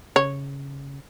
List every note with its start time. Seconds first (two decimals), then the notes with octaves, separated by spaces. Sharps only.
0.16 C#3 C#5